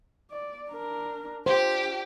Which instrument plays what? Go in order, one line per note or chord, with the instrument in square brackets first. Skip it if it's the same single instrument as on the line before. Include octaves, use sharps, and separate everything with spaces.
[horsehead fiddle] D5
D4 A#4
[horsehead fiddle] D4 F4 [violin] G4 [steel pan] C5